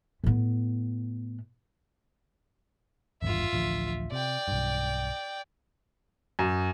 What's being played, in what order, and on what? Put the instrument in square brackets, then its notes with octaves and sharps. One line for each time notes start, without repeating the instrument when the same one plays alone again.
[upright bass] A2 B3
[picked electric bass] G#1 E2 G2 [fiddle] F4 E5
[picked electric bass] A1 D2 F3
[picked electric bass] C3 [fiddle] D5 G5
[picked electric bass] B1 G2
[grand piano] F#2